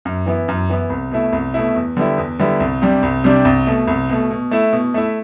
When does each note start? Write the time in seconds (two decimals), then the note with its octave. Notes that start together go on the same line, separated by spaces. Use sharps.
0.05 F#2
0.26 E3 B3 E4
0.48 F#2
0.69 E3 B3 E4
0.90 C2
1.11 B2 A3 E4
1.33 C2
1.54 B2 A3 E4
1.76 E2
1.97 D3 G3 B3 E4
2.18 E2
2.39 D3 G3 B3 E4
2.60 C2
2.82 C3 G3 D4
3.03 C2
3.24 C3 G3 D4
3.45 C2
3.67 B2 A3
3.88 C2
4.10 B2 A3
4.31 B2
4.51 A3 E4
4.73 B2
4.94 A3 E4